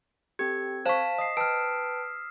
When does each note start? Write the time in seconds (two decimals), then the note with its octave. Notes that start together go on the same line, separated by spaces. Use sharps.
0.39 C4 G4 A4 G#6
0.86 C5 F5 A5 C#6 B6 E7
1.18 D#5 D#6 C7
1.37 B4 G5 A5 E6 F6 D7